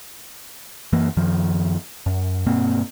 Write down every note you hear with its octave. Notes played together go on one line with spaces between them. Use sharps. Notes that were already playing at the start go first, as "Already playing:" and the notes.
F#2 E3 A#3
F#2 D#3 F3
F#2
G2 B2 A#3 C4